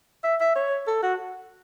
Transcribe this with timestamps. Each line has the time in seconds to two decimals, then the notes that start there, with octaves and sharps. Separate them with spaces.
0.24 E5
0.40 E5
0.55 C#5
0.87 A4
1.03 F#4